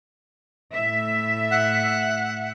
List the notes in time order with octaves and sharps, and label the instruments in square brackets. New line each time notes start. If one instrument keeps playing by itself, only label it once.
[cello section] A2 E5
[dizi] F#5